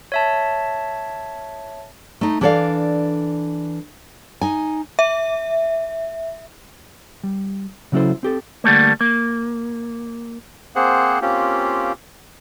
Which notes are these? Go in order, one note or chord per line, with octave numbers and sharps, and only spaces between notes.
C#5 E5 A5
A3 D#4
E3 D4 A4 C5 D5 F5
D#4 G#5
E5
G3
C#3 F#3 C#4 E4 A4 C5
C4 G4 A4
D3 G3 A3 A#3
A#3
A#3 C4 G#4 C5 F#5
A#3 C4 C#4 F4 G4